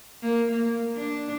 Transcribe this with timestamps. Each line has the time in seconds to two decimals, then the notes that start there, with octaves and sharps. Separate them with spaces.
0.22 A#3
0.51 A#3
0.96 D4